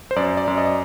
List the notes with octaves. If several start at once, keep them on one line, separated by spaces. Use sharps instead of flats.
C5
F#2 D5
D5
F#2
D#5